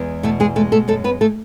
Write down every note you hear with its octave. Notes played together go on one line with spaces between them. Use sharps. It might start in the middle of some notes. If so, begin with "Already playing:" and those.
Already playing: E2 G#3
B2 A3 A4
G#3 G#4
G#3 A3 A4
A3 A4
F#2 A3 A4
B3 B4
A3 A4